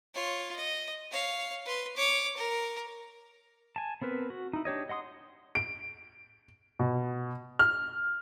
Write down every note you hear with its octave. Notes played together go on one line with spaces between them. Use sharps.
F4 C#5
D#5
C#5 F5
B4 C6
C#5 D6
A#4
G#5 A5
B3 C4 A#4 B4
F#4
D#4 E4
D4 G4 C#5 D#5
D#5 F#5 C6 D#6
D7
B2
F6